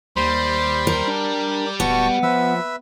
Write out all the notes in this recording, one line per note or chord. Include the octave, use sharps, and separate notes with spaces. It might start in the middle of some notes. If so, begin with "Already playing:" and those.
D#2 G3 C5 B5 C6
A#4
D4
D5
D1 B3 F#4 A5 C#6
F3 B4 E5 E6